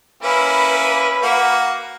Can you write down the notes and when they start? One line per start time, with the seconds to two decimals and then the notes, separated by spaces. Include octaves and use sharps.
0.23 A#3 C#4 E4 B4
1.22 A#3 F#4